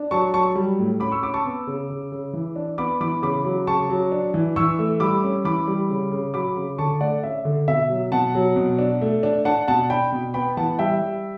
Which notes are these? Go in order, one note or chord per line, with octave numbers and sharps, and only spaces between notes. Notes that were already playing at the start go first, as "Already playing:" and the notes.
Already playing: D4
F#3 A5 C#6
F#3 A5 C#6
G3
A2
C#4 B5 D6
C#6 E6
C#4 B5 D6
A5 C#6
B3
C#3
C#3
C#3
E3
D4
B3 B5 D6
E3 B5 D6
C#3 B5 D6
F#3
C#3 A5 C#6
F#3
D4
E3
E3 C#6 E6
A3
G3 B5 D6
C#4
E3 B5 D6
G3
C#3
C#3
F#3 B5 D6
C#3
D3 A5 C#6
A3 D5 F#5
C#4 E5
D3
B2 E5
F#3
B2 F#5 A5
F#3
B2
D4
A3
D4
D4 F#5 A5
B2 F#5 A5
D4 G5 B5
B2
B3 G5 B5
E3 F#5 A5
G3 E5 G5
G3